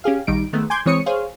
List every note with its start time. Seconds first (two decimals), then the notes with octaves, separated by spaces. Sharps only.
0.04 C#4 G4 G#4 F5
0.27 A#1 D#3 G3 D#4 D7
0.53 D#3 G#3 A3 B3
0.70 G#5 C6 D6 G6 G#6
0.86 E3 G#3 C4 C#5 D#6 C#7
1.06 G#4 C5 C#5 F5